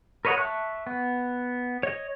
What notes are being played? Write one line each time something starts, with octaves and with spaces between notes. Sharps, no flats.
A#4 B4 C#5 D#5 F#5
E5 A5 C#6 F#6
B3
C#5 D#5